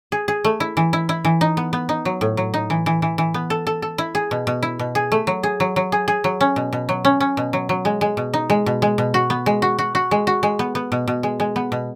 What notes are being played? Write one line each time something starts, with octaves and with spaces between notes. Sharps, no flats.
G#4
G#4
A3
E4
E3
E4
E4
E3
D#4
B3
B3
D#4
F#3
A2
F#3
D#4
E3
E3
E3
E3
B3
A4
A4
A4
E4
G#4
B2
B2
E4
B2
G#4
A3
F#3
G#4
F#3
F#3
G#4
G#4
F#3
C#4
B2
B2
F#3
C#4
C#4
B2
F#3
F#3
G#3
G#3
B2
D#4
G#3
B2
G#3
B2
F#4
B3
G#3
F#4
F#4
F#4
G#3
F#4
G#3
B3
B3
B2
B2
G#3
G#3
B3
B2